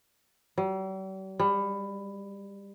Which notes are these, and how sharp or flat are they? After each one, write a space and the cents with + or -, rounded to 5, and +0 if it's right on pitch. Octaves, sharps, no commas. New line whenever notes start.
G3 -45
G3 +25